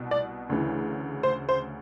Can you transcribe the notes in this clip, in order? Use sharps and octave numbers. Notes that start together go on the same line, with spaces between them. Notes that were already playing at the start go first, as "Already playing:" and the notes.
Already playing: C2 B2
D5
D2 C#3 E3
C5
C5